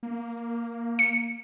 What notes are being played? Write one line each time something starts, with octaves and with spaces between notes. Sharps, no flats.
A#3
C#7